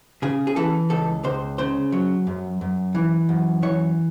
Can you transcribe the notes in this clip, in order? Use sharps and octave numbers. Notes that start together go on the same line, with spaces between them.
C#3 G#4
G#4
E3 A4
C#2 A4
C#2 C5
C#3 C5
F#3
F#2
F#2
E3
F#2
E3 C#5